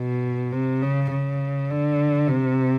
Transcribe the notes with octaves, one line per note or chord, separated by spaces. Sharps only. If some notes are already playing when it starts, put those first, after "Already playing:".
Already playing: B2
C3
C#3
C#3
D3
C3